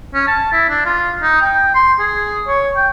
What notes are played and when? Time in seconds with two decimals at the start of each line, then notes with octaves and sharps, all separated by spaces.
0.14 C#4
0.28 A5
0.52 E4
0.69 D4
0.86 F4
1.22 D#4
1.41 G5
1.75 C6
2.00 G#4
2.48 C#5
2.76 G5